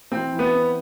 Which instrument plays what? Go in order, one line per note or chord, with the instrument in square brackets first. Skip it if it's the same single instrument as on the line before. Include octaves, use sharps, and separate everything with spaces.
[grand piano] E3 [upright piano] C4
[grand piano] E3
[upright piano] B3
[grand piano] C4